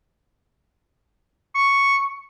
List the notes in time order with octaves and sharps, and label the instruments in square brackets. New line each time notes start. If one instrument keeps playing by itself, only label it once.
[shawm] C#6